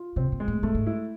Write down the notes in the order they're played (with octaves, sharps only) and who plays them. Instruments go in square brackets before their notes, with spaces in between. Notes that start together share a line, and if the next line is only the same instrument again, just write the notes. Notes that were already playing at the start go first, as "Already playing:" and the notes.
Already playing: [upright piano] F4
[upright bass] C3 [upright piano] C4
[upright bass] A#2
[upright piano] G#3
[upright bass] A2
[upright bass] A2 [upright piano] A3
[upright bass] G#2
[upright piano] E4